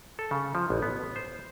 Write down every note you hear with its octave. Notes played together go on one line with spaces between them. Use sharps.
A4
C#3
F3
A1
B3
C5